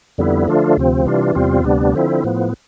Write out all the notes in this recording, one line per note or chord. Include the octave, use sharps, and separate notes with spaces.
F2 D3 G3 B3 E4
D3 F3 A3 D4 F4
D2 C3 F3 C4
C3 E3 G3 D4 F4
E2 C3 G3 C4 F4
D2 C3 G3 B3 D4
D3 F3 C4 E4
A2 F3 B3